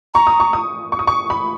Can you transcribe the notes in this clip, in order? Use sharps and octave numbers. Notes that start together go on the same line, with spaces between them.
A#5 C#6
D#6
C#6
D#6
C#6
D#6
C#6
B5